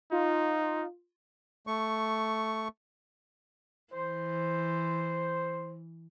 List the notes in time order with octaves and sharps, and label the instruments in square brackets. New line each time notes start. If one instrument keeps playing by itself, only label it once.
[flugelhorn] D#4 [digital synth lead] F4
[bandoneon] A3 C#6
[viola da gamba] E3 [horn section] C5